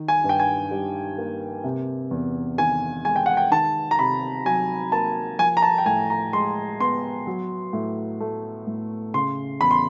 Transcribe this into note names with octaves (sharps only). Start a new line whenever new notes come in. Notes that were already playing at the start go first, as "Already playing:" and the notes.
Already playing: D#3
G#5
G2
G5
G#5
G3
A#3
C3
E2
D#3 G#5
G#3 G#5
G5
F#5
G5
D#3 A5
A#5
C3 B5
F#3 G#5
A#3 A5
F3 G#5
A#5
A5
G5
A2 G#5
A#5
G#3 C6
B3 C6
F#3
A2
A3
A2
C#3 C6
E2 B5
C6